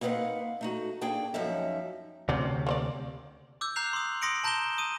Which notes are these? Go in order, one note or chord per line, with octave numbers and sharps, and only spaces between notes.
A#3 C4 D#4 B4 F5 F#5
A3 D#4 F#4
A#3 D4 G#4 G5 A5
F#2 F3 C#4 D#4 E5
D2 C3 C#4 C5 D5
A#3 C5 D5
D6 E6 G6
A#5 F#6 G6 C7 F7
C6 D#6
C6 D#6 A#6 C#7 D7 F#7
A5 A#5 G6 A#6 E7 G7
D#6 D#7